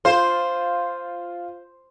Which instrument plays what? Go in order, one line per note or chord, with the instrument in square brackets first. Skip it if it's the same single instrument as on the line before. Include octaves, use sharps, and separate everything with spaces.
[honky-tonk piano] F4 [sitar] C5